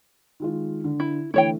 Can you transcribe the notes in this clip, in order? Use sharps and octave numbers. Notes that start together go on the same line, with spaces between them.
D#3 G#3 F4
D3
E4
D3 E3 A3 E4 C#5 G5